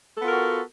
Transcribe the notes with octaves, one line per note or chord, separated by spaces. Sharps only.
B3 F4 F#4 A4 A#4